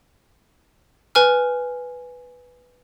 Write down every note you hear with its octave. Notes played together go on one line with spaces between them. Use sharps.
B4 G#5 F6